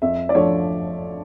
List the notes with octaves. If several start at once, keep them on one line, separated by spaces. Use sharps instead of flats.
F2 E5
D5
D3 F3 A3 C#5